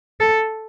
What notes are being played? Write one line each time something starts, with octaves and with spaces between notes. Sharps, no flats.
A4